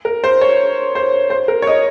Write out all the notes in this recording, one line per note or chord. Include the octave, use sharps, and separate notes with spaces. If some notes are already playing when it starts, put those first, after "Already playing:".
A#4
C5
C#5
C5
C5
A#4
C#5
D#5